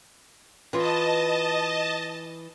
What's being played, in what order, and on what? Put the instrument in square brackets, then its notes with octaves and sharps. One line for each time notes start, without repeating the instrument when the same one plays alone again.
[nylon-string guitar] E3 F4 [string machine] D#5 A5